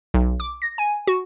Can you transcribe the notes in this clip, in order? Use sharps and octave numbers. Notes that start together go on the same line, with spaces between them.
B1
D6
A#6
G#5
F#4